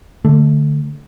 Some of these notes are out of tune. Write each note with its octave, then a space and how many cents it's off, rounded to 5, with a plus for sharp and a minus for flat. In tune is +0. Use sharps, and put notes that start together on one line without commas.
D3 +5 A3 +0